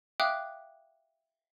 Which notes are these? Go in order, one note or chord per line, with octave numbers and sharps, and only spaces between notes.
E5 F5 G5 D6 D#6 F#6